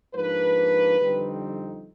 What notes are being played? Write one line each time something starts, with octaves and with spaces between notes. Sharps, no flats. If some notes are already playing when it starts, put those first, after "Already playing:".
G#2 F3 A#3 D4 B4
F2 D3 G3 C4 D#4